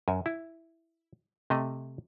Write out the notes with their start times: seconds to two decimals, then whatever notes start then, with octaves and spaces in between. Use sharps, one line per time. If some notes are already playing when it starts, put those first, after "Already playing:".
0.08 F#2 G#5
0.26 E4
1.50 C3 A3 D#5